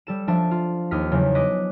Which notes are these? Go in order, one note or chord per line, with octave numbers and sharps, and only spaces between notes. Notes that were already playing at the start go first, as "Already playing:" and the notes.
G3 A4 E7
F3 D4 E5 A5
F4
D#2 D#6 F6 B6
E2 C#3 F#3
D#5 D6 D#6 F#6 B6